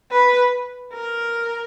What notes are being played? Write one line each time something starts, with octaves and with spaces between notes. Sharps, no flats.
B4
A#4